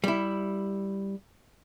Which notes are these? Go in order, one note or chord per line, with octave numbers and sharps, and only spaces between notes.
G3 E4